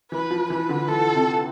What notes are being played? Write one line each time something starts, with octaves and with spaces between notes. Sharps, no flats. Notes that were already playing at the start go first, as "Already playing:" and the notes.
E3 B4
F3
E3 B4
D3
E3 A4
C3